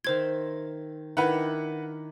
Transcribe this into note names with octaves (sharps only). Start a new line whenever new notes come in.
D#3 C5 E5 C6 G#6
D#3 D4 E4 B4 F#5